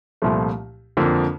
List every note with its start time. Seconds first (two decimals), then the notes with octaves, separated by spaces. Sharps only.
0.22 C2 A#2 F3 A3
0.97 F2 D3 F3 A#3 D4